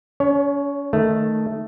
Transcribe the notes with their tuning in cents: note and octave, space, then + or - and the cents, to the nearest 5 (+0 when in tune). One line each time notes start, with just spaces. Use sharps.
C#4 +35 C#5 +5
D#3 +0 A3 +0